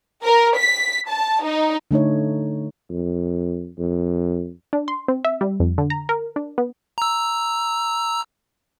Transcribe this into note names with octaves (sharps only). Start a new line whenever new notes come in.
A#4
B6
A5
D#4
D3 A3 D#4 C#5
F2
F2
D4
C6
C4
E5
G3
F2
D3
A#5
A#4
D4
B3
A#5 E6